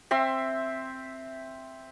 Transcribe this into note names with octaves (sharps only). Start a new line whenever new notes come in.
C4 E5 C6